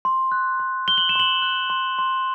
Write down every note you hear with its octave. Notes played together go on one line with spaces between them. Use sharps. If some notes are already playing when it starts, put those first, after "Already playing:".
C6
F#6
C6
F#6 G7
F#7
E7
C6 F#7
F#6
C6
C6